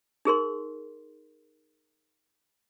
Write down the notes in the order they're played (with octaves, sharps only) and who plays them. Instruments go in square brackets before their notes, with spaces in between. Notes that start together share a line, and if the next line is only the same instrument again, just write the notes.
[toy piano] D#4 G#4 A#4 C6